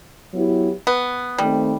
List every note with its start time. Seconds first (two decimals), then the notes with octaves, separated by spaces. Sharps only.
0.34 F#3 B3 E4 G4
0.87 B3
1.38 D#3 G3 A3 C4